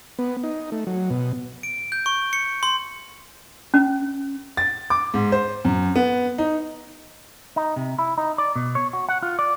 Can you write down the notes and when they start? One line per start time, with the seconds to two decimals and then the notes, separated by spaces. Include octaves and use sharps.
0.19 B3
0.44 D#4
0.72 A3
0.87 F#3
1.10 B2
1.63 D7
1.92 G6
2.06 C#6
2.33 C#7
2.63 C6
3.74 C#4
4.57 A6
4.90 D6
5.14 G#2
5.32 C5
5.65 F#2
5.96 B3
6.38 D#4
7.56 D#4
7.76 C3
7.99 E4
8.18 D#4
8.38 D5
8.56 B2
8.75 C#5
8.93 F#4
9.09 F#5
9.23 F4
9.39 D5